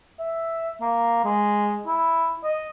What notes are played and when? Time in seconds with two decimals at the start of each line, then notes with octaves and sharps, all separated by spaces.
0.19 E5
0.81 A#3
1.25 G#3
1.87 E4
2.44 D#5